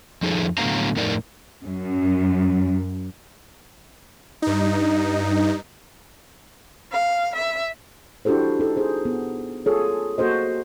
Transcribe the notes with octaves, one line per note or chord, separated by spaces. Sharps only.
F2 F3 D#4 G#4 A4
A2 D3 F#3 B3 F5 A#5
F2 A2 D#4 A#4 D5
F#2
G2 D#4
F5
E5
D4 E4 F#4 G4 A4 C5
D#4 A4
G#4 C5
B3
F4 G#4 A4 C#5
A#3 F#4 A4 C5 D#5